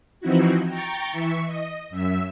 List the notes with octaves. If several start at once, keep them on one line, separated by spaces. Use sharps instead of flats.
E3 F3 C4 D#4 E4 F#4
G5 A#5 C#6 G6 A6
E3 E5 C#6
D#5
F#2 E5 E6